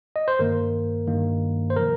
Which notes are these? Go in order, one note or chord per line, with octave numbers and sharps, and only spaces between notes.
D#5
C5
G2 D#3 A#3 A#4
G2 D#3 A#3
C5
C3 F3 A#4